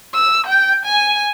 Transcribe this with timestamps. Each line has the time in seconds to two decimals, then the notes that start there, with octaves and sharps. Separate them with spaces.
0.14 E6
0.47 G5
0.85 G#5